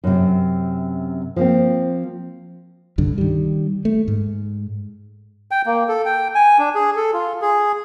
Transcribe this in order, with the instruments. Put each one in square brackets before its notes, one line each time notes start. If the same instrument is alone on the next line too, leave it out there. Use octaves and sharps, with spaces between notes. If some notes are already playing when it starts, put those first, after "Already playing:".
[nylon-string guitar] F#2 C3
F3 A#3 C4
[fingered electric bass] C2 G2 D3
D#3 G3
A3
G#2
[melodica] G5
A#3
A4
G5
G#5
D4
G#4
A4
F4
G#4